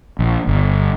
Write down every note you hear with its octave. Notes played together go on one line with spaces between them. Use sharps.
A#1
G1